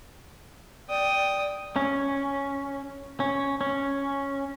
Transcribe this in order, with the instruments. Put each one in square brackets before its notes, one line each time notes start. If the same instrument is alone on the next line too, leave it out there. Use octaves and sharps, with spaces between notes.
[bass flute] D5 [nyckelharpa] G5 D#6
[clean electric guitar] C#4
C#4
C#4